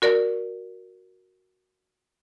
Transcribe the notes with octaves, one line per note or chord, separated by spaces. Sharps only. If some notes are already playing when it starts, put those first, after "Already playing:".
F#4 A#4 D5